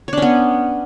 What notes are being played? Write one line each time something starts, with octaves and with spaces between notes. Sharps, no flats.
B3 C#4 D4 C#5